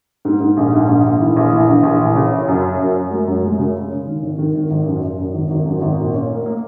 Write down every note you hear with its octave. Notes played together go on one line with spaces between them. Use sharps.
G#2
G#2
A#1
G#2
A#1
A#1
E3
A#1
E3
A#1
A#1
E3
C#3
C#4
F#2
C#4
F#2
C#4
G#3
F#2
G#3
C#3
C#4
C#4
D#3
G#1
D#3
G#1
G#1
F#2
F#2
F#2
G#1
G#1
F#2
G#1
A#2
C#4
A#3
A#3